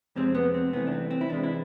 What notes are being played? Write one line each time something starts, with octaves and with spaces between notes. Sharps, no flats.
F2 C3 G#3 C4
B3
C4
C2 C3 E3 A3 B3
D4
C4
C4
E4
E2 C3 G#3 D4
E4